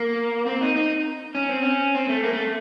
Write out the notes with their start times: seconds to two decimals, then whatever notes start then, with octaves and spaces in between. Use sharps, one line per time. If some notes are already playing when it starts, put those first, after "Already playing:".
Already playing: A#3
0.46 C4
0.61 D#4
0.76 D#4
1.35 C#4
1.49 C4
1.62 C#4
1.95 C4
2.09 A3
2.23 A#3
2.33 A3